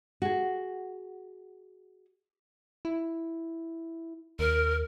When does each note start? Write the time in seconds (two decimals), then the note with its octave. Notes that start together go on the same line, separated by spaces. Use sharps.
0.22 F#4 G#4
2.85 E4
4.39 D#2 A#4